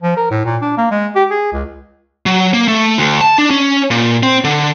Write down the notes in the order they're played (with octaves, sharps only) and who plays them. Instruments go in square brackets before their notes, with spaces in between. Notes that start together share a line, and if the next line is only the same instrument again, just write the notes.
[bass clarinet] F3
A#4
A2
A#2
D4
A#3
G#3
G4
G#4
C#2
[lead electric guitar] F#3
A#3
A3
D2
A5
D4
C#4
A#2
C4
D3